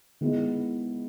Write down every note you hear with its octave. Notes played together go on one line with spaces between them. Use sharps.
D#3 G#3 B3 E4